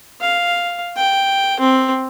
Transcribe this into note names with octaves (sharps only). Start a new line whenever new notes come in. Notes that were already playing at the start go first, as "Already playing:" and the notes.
F5
G5
C4